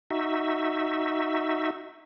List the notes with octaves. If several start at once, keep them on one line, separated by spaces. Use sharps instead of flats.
D#4 F#4 E5